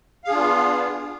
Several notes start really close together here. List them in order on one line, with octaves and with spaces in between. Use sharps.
F5 G#4 D4 F4 B3